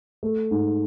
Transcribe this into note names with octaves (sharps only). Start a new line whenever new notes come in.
A3
G#2